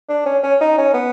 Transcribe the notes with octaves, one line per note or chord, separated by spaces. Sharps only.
D4
C#4
C#4
D#4
C#4
B3